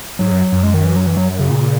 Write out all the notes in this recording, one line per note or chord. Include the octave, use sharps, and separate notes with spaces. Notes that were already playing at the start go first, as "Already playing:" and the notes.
G#2 F#3
F#2
F#2
G#3
D#3
E3
F#3
E3
F#3
C#3
A#2